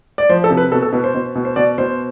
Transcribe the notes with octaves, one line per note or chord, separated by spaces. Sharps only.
D5
F3 C5
A4
C3
B4
B2 A4
A4
B2 B4
C5
B2
B2
C5
B2 D5
B2 C5